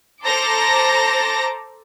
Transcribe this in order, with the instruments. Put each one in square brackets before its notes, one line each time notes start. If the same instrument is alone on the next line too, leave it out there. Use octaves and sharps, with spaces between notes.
[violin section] A4 C5 A5 A#5 D6 A#6